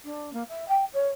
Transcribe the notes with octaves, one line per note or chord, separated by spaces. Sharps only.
D4
A#3
E5
G5
C#5